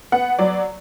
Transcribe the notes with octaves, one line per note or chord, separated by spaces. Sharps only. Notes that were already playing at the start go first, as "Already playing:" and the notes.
B3 F#5
F#3 D5